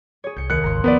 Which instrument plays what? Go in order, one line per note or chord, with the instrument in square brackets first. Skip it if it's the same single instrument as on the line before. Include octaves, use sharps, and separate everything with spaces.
[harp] G#4 C#5
[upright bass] C2 [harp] G6 C#7
[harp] D#2 [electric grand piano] F#6 C#7
[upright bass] G#1 C#2 [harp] A#5 C6
[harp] F3 A#4 [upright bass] F#3 [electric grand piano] B3 B4 D5